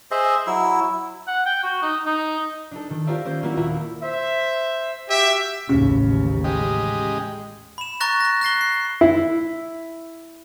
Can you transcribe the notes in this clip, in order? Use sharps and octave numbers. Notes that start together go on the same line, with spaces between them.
G#4 C5 D#5 E5
F#3 E4 E6
F#5
G5
F#4
D#4
D#4
D4 D#4 A4
D#3 A4
F4 G4 A#4 C5 D5 E5
A#3 C#4 C5 G6
A#3 C4 E4 F#4 A#4
D#1 E4 F4 A#4 E5 A#5
C5 E5
F#4 G4 E5
A1 D#2 C#3
G#3 G4 D#5
B5 E7
A#5 C#6 F#6 A6 A#6
F#6 A#6
F#6 A#6 C7 G7
C7
E4